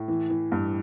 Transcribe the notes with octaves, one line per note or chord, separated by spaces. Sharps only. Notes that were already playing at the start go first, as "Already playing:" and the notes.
Already playing: A2
E3
E3
G2